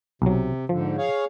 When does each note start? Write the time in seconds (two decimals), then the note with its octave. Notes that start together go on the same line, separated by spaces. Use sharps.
0.22 B1 C3 F#3
0.69 G#2 D3 F3
0.98 G#4 C#5 F5